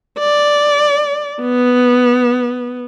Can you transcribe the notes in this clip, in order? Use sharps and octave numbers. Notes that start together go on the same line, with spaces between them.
D5
B3